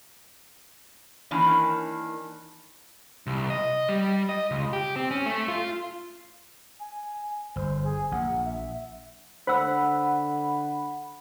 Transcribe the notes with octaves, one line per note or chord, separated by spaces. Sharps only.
D#3 E3 A#3 C#4 D4
C2
D#5
G3
D#5
C#2
G4
C4
C#4
A3
F4
G#5
G1 C5
G#4
A#1 F#5
E5
D3 C5 F#5 B5 E6